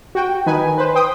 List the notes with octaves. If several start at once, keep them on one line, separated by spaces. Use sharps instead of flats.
F#4 G5
D#3 D#4 B4 G#5
B4 C5
C5 G5 D#6